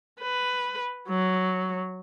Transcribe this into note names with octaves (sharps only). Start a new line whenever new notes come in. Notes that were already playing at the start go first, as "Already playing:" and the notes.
B4
F#3